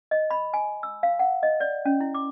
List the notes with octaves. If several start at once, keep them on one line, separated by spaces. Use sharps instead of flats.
D#5
B5
G#5
E6
F5
F#5
D#5
D5
C#4
E4
D6